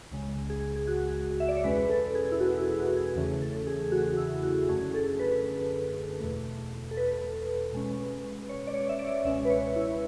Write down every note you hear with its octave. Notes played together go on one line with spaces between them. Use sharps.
C#2 C#3 G#3
G#4
G#4
F#4
E5
D5
C#5
E2 B2 G#3 C#4 B4
A4
G#4
E4
F#4
E4
F#4
G#4
E2 C#3 E3 A3 C#4
A4
G#4
G#4
F#4
F#4
E4
F#4
F#2 D3 A3 C#4 G#4
A4
B4
E2 B2 A3
A4
B4
B2 G#3 C#4
C#5
D5
C#5
E5
D5
C#2 B2 G#3 C#4 E5
B4
C#5
E4